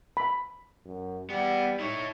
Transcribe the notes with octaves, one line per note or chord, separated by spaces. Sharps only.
B5
F#2
G3 B3 E4
D#4 E4 C#5